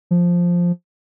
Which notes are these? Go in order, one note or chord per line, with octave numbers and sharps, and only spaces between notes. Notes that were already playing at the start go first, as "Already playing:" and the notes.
F3